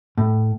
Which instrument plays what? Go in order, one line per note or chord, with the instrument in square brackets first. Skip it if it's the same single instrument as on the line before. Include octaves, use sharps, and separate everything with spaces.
[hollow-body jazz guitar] A2